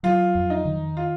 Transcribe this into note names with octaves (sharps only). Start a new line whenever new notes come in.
F#3 F4
F2
D#4
D#3
F4